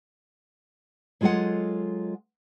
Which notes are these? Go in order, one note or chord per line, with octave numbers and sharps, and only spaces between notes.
F#3 G#3 F4 A4 D#5 F#5